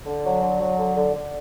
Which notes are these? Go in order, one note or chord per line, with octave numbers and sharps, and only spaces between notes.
D3
F#3
D3
F#3
D3
D3
D3